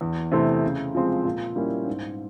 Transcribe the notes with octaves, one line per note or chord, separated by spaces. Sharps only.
E2
C3 E3 A3 C4
C#3
F3 G#3 C4
A#2
G3 A#3 C#4 E4
G#2